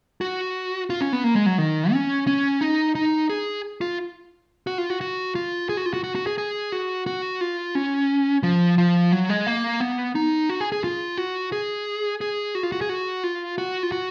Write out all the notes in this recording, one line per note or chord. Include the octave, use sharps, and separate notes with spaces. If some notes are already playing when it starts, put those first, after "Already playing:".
F#4
F4
C#4
B3
A#3
G#3
F#3
D#3
C#4
C#4
D#4
D#4
G#4
F4
F#4
F4
F#4
F#4
F4
G#4
F#4
F4
F#4
F#4
F#4
G#4
G#4
F#4
F#4
F4
C#4
F3
F3
F#3
G#3
A#3
B3
D#4
F#4
G#4
G#4
F4
F#4
G#4
G#4
F#4
F4
F#4
G#4
F#4
F4
F#4
F4
F#4